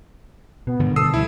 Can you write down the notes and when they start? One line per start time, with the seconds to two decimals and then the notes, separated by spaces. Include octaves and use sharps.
0.67 B2 B3
0.80 G#2 D3 D#3 G3
0.96 B2 A4 D#6 E6 C7
1.14 C#2 F3 G3 E4